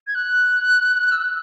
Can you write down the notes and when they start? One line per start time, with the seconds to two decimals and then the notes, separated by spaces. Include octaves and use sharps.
0.07 G#6
0.15 F#6
1.12 E6
1.23 F#6